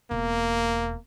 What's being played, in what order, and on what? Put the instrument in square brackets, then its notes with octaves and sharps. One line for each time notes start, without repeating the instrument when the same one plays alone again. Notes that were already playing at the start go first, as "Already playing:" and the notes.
[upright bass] E1 [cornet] A#3